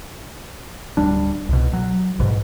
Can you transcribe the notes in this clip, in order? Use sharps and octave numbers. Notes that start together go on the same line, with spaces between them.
D1 G3 D4
C2 B2
F#3
A1 G#2 B2